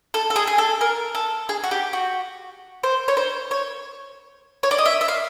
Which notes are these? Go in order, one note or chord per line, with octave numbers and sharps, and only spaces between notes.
A4
A4
G#4
G#4
A4
A#4
A4
G#4
F#4
G4
F#4
C5
C#5
C5
C#5
C#5
D5
D#5
E5
E5
F5